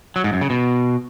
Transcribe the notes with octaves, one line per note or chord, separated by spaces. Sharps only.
F#3
G#2
F#2
C#3
B2